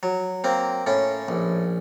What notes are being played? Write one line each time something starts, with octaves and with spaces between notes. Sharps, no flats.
F#3
A#3 C4
A2 C#4
A#1